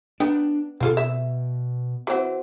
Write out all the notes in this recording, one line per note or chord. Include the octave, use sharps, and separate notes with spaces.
B3 D4 D#4 G5
B2 C4 F4 A4
E5
E3 C4 F#4 C5 F#5